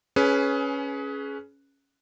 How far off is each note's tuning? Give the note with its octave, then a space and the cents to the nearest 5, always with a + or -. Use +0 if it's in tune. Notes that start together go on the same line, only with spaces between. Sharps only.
C#4 +0 G#4 +25 B4 -5